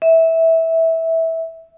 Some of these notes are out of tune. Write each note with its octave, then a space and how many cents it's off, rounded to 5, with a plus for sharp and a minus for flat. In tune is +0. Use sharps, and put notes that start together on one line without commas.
E5 -15